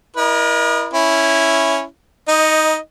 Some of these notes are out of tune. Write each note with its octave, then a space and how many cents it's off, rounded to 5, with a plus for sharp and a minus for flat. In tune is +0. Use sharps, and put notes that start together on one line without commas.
E4 +0 A#4 +40 D#5 -35
C#4 +0 E4 +0
D#4 +20 D#5 +0